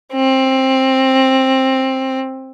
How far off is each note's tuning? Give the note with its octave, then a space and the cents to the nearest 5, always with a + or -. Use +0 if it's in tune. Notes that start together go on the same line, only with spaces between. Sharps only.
C4 +15